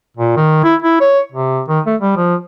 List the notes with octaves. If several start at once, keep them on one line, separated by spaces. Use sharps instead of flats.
A#2
D#3
E4
E4
C#5
C3
D#3
A3
G3
F3